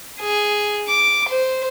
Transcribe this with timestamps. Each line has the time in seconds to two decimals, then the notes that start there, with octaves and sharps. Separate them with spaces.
0.20 G#4
0.88 D6
1.30 C5